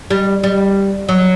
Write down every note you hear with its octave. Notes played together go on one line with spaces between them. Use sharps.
G3
G3
F#3